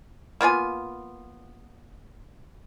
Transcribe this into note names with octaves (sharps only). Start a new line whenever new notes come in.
A#3 B3 F4 G#5